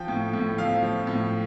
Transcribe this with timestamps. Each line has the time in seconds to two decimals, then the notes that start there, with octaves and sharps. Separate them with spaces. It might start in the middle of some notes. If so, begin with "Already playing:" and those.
Already playing: F3 G5
0.08 A2
0.33 A2
0.58 F3 F5
0.83 F3
1.07 A2